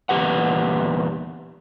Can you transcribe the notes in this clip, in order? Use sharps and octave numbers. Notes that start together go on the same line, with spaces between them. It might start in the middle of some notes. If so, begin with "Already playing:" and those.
E2 A#2 D#3 G4 B4 F#5